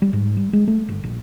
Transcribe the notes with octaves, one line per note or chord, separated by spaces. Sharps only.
G3
G#2
G3
G#3
A3
G1
A#1